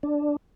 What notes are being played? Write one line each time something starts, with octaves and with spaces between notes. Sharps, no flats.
D4